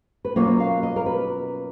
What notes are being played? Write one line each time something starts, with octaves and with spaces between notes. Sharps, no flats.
B4
B2 F#3 A#3 C#4 F4 C#5
F5
D#5
A#4
B4